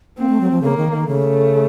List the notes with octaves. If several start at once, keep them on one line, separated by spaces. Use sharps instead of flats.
A#3 C4
A3
F#3
F3
C#3 A#3
D#3
D#3
C#3 A3